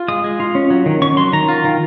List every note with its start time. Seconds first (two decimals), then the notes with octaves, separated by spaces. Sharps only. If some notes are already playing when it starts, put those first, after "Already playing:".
Already playing: F4
0.08 G#3 D#6
0.24 G#3
0.40 F4
0.55 C#4
0.70 F#3
0.86 D#3
1.02 C#4 C#6
1.17 F#3 C6
1.33 D#3 A#5
1.48 F4
1.65 D#3